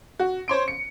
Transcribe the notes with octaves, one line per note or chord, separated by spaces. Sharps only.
F#4
C5 C#5 C6 D7
C#7